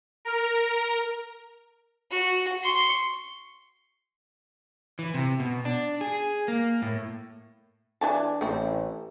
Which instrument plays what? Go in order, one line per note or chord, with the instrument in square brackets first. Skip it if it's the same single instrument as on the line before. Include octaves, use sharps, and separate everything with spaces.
[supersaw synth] A#4
[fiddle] F#4
C6 C#6
[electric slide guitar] E3
C3
B2
D4
G#4
A#3
A2
[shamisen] E3 G#5 A5 [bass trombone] D4
[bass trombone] A1 [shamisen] A3 C4